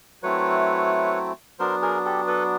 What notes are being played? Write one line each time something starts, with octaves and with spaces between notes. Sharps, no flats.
F#3 A3 C4 E4 B4 C#5
F#3 B3 D4 A#4 C5
G#4 A#4
G4 A4
A4 B4